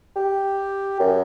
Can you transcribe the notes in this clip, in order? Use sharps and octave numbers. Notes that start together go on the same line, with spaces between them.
G4
F#2